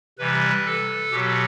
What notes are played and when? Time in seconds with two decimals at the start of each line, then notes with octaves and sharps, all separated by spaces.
0.19 C3 E3 G3 B4
0.66 A4
1.12 B2 F#3 G4